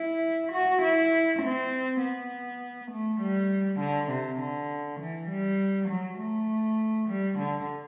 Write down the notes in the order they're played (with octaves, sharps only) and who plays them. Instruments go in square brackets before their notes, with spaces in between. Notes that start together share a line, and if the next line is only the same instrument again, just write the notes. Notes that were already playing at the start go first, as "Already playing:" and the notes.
Already playing: [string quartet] E4
F#4
E4
C4
B3
A3
G3
D3
C3
D3
E3
G3
F#3
A3
G3
D3